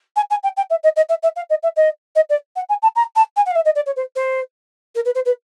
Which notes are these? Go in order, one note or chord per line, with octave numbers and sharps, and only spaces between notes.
G#5
G#5
G5
G5
E5
D#5
D#5
E5
E5
F5
D#5
E5
D#5
D#5
D5
F#5
G#5
A5
A#5
A5
G#5
F#5
F5
E5
D#5
D5
C#5
C5
C5
A#4
B4
C5
B4